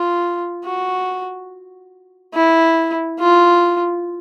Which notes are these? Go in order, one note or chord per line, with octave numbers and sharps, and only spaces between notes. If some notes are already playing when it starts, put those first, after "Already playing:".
Already playing: F4
F#4
E4
F4